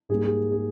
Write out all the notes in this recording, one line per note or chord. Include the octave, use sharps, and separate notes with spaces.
G#2 G3 A#3 G#4
G#4
G#4